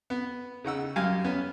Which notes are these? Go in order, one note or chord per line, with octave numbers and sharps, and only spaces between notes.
B3
C#3 D#4 F#5 E6
F#2 G4 F5 G#5
B3 C#4